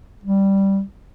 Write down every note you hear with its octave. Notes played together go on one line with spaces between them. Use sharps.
G3